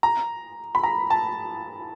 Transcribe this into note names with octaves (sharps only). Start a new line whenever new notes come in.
A#5
B5
A#5
A5